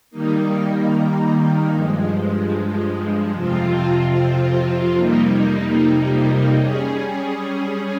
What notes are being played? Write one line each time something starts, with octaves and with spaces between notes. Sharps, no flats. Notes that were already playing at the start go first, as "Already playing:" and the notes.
D#3 G3 A#3 D#4
G2 F3 G#3
F2 C3 F3 C4 F4
F2 C3 G3 A#3 D#4
G3 C#4 G#4